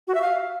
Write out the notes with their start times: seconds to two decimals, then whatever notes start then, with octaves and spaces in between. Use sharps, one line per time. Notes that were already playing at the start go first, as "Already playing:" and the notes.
0.08 F#4
0.15 E5
0.22 F5